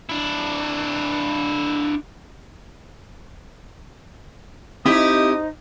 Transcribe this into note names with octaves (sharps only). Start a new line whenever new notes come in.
D4 E4
C4 D#4 E4 G4 C5 D#5 E5 D#6